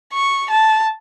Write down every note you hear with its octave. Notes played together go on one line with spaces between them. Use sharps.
C#6
A5